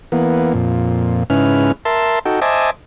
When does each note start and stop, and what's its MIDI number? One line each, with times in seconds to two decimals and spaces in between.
0.12 0.53 52
0.12 0.53 58
0.12 0.53 59
0.54 1.24 41
0.54 1.24 46
1.30 1.72 44
1.30 1.72 49
1.30 1.72 61
1.30 1.72 64
1.30 1.72 71
1.30 1.72 89
1.85 2.19 70
1.85 2.19 76
1.85 2.19 81
1.85 2.19 84
2.25 2.40 63
2.25 2.40 66
2.25 2.40 69
2.25 2.40 79
2.42 2.70 72
2.42 2.70 75
2.42 2.70 76
2.42 2.70 80
2.42 2.70 81
2.42 2.70 86